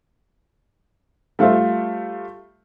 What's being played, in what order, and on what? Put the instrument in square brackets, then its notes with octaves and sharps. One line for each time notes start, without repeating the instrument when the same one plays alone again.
[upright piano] G3 A3 F4 C5 E5